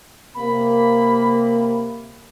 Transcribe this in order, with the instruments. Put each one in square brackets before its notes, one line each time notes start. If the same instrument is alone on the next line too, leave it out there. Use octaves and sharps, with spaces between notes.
[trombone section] C3 A#3 [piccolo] B5